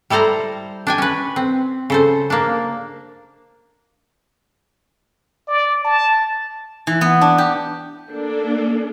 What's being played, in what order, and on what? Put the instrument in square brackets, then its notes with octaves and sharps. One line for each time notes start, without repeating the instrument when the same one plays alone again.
[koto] G3 E4 A4 C5 A#5
D4 G5 G#5
C#4 B4
C4
C#3 A4 C5
A#3 D4
[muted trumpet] D5
A5
[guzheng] E3
B3
D4
G4
[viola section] A#3 D4 A4